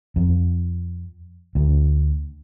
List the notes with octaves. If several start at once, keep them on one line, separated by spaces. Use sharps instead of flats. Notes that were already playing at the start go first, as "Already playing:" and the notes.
F2
D2